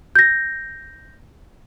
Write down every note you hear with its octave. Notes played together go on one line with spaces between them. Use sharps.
G6 A#6